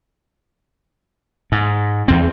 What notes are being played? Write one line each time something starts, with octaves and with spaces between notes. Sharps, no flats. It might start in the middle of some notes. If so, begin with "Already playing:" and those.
G#2
E2 C4